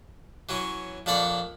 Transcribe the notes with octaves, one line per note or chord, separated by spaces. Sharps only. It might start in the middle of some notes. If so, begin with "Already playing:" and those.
E3 F#3 C#4
F2 A#2 D4 D5 F#5 B5